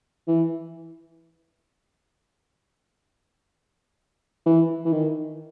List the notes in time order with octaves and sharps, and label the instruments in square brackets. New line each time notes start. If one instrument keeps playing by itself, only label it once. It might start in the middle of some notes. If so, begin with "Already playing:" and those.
[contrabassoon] E3
E3
E3
D#3